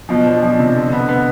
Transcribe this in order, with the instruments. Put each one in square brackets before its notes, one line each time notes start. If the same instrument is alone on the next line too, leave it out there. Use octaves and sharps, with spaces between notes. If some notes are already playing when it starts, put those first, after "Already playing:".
[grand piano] B2 [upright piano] F3
[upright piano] D4
F3
C3
D3
B3
B3